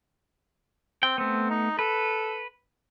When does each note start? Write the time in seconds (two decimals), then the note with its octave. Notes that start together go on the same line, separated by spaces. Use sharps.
1.03 C4 G5
1.18 A3 B3 C4
1.50 D#4
1.79 A4 B4